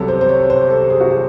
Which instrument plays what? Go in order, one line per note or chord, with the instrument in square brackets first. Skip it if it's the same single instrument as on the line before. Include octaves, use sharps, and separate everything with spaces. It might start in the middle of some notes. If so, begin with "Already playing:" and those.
Already playing: [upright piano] C2 C3 F#3 A4
C5
C5
C#5
C5
A4
G#4
F#4
G#4